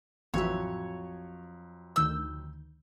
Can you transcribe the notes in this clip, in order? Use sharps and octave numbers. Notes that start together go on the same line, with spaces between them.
A1 F2 E3 F#3 C#5 E5
D2 D#3 E6 G6